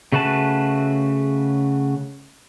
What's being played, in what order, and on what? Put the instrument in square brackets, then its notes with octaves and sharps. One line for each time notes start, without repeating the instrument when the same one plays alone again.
[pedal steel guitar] C#3 A3 F#4 B4 A5